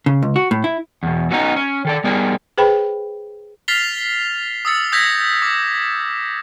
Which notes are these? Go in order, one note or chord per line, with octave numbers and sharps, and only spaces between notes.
C#3
C#2
F#4
A2
E4
E2 B2
F#3 B3 C#4 D#4
C#4
D#3 A4 D5
G3 B3 D#4 G#4 A#4 D5
G#4 B4 C5 G5 B5
F6 A6 B6 C7 F7 G7
D#6 E6 A6 C#7
D#6 E6 G6 G#6 A#6 B6
D6